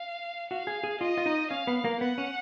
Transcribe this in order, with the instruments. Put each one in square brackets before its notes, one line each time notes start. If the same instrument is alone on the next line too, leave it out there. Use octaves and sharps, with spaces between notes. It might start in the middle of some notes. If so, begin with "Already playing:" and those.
Already playing: [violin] F5
[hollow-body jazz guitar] F#4 [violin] F5
[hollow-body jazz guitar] G#4
G#4
[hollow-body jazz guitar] F4 [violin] D#5
[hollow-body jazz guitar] F4
D#4
[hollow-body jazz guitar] C#4 [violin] F5
[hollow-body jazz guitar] B3
A#3
[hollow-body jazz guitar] B3 [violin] F#5
[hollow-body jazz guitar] C#4